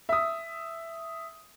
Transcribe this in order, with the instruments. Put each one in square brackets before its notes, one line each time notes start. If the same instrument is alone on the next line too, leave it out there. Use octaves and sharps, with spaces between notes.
[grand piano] E5 D#6